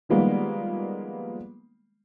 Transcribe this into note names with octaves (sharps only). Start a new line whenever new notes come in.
D#3 F3 G3 G#3 A#3 B3